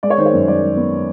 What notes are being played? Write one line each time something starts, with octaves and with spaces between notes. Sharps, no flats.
G#3 D5
C#5
D#3 C5
C#5
F#2
G#3 D5
G#3
B3